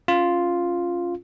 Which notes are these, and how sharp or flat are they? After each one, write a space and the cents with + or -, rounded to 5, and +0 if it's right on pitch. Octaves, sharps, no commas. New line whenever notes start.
C#4 +0 F4 +0